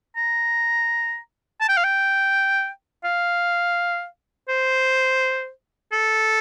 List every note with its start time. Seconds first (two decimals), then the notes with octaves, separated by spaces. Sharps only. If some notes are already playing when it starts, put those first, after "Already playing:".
0.16 A#5
1.61 A5
1.69 G5
1.77 F5
1.84 G5
3.04 F5
4.48 C5
5.93 A4